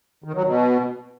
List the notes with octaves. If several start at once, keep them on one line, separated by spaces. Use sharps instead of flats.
D#3
F#3
B2